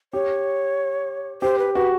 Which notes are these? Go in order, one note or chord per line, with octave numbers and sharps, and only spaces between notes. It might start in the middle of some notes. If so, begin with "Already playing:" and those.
G4 C#5
G4 C5
B4
F#4 B4